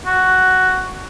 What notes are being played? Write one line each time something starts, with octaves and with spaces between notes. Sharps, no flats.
F#4